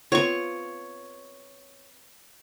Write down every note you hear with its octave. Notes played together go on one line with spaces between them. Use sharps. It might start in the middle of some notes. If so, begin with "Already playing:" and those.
B3 C4 F4 C#5 C#6